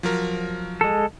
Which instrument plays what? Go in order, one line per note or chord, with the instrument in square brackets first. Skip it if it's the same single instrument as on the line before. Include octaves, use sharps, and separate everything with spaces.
[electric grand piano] F3 F#3 A#4
[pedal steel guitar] G#3 A4